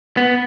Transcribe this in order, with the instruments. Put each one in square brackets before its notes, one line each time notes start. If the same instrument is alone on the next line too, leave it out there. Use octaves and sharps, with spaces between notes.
[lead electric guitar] B3